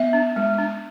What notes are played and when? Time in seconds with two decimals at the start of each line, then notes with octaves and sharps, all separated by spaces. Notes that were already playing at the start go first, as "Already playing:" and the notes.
Already playing: B3 E5
0.13 D4
0.36 G#3
0.58 D4